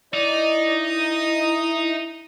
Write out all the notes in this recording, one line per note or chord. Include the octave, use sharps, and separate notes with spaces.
D#4 E4 D5 D#5
D#6